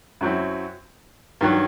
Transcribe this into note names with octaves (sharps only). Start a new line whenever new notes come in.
F#2 F#3 C4 E4
G2 D#3 F#3